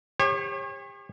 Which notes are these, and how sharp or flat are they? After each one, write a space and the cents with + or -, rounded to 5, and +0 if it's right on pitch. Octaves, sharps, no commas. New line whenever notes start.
G4 +35 C#5 -35